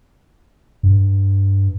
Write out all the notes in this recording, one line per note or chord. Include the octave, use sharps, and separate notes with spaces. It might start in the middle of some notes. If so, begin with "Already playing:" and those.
G2